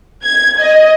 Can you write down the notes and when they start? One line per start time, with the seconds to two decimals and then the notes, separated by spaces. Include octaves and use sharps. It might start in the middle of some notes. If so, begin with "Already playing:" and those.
0.24 G#6
0.61 D#5